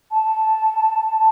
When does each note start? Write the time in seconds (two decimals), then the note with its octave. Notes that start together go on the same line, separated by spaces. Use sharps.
0.12 A5